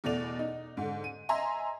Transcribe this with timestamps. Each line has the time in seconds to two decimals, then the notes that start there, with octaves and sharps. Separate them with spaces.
0.04 E2 B2 A3 D5 F7
0.39 D#4
0.77 G#2 D3
1.04 D#7
1.29 D#5 E5 G#5 A#5 C6